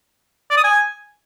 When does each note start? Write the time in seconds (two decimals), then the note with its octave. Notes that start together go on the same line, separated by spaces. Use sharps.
0.50 D5
0.57 D#6
0.64 G#5